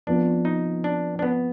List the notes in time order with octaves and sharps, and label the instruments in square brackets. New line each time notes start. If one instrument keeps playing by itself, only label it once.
[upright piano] F2 F3 B3 F4 [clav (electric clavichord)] D4
[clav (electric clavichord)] D#4
D4
D4
B3